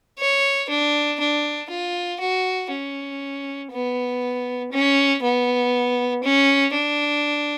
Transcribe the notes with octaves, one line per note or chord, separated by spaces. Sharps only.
C#5
D4
D4
F4
F#4
C#4
B3
C#4
B3
C#4
D4